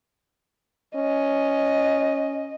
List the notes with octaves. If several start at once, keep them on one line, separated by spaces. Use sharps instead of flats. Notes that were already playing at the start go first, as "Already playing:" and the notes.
C#4 D#5